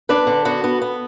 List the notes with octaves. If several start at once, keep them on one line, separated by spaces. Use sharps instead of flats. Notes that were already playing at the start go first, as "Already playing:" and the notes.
D4 B4
D3
B3 F#4
B3
B3